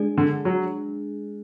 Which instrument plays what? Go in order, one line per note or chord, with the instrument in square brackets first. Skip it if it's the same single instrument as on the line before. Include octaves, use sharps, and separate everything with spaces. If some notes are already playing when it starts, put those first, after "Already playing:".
Already playing: [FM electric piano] G#3 D4 G#4
[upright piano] D3
F#3